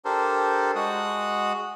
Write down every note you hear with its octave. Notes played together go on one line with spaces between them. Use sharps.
D4 G4 A4 A#4 C5
G#3 F#4 F#5 D#6